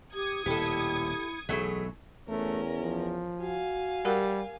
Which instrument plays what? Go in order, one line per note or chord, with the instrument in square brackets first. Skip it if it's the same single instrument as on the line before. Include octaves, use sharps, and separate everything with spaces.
[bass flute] G4 [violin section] D#6 G#6 C#7
[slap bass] D#1 B2 [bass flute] E4 [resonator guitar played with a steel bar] G4 A4
[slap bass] B1 [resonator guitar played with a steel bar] E3 F#3 A3 [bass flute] G#4
[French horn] E2 [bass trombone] A3 [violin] C#4 A#4
[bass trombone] F3
[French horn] F#4 [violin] F5 G#5
[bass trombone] G3 [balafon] G4 A#4 F#5